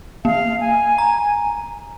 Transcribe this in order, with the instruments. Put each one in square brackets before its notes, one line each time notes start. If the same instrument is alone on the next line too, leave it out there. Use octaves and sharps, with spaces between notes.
[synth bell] A#3 [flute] F5
[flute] G#5
[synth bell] A#5